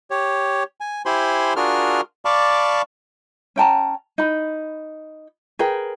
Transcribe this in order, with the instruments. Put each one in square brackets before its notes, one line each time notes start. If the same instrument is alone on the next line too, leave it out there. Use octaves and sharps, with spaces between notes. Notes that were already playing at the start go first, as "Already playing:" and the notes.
[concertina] G4 C#5
G#5
E4 G4 C5 G#5 B5 C6
D4 F4 F#4 G#4 A#4 F6
D5 F5 A5 B5 C#6 D6
[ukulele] C#4 G5 A5 A#5
D#4 B5
G#4 A#4 B4 G5